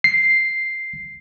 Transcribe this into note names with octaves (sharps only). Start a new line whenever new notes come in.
C7